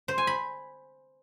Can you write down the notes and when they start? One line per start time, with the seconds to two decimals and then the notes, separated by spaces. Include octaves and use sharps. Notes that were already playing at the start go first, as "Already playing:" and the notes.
0.08 C5
0.18 G#5
0.27 B5